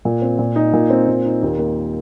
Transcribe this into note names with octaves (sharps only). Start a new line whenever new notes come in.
A#2
C4
A#2
D#4
A#2
C4
A#2
D#4
D#2
A#3